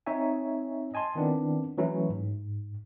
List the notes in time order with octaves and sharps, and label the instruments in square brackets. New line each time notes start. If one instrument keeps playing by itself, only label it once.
[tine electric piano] C4 D#4 C#5 E5 G#5
D#5 G#5 A5 C6
D#3 B3 C4 D4 E4
E3 F#3 A3 C#4 E4
G#2